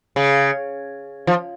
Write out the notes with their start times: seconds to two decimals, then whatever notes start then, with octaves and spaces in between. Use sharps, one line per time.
0.16 C#3
1.27 F3